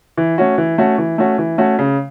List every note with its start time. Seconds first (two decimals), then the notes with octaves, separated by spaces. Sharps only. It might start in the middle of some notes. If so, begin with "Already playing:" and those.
0.17 E3
0.38 A3 C#4 F#4
0.58 E3
0.78 A3 C#4 F#4
0.98 E3
1.18 A3 C#4 F#4
1.38 E3
1.58 A3 C#4 F#4
1.79 C#3